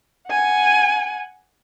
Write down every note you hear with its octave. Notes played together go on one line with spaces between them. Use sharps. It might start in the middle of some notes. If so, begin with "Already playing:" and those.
F#5 G#5